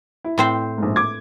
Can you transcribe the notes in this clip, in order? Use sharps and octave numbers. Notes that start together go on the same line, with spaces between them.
E4
A2 C4 C5
A#1 G#2
D6 G#6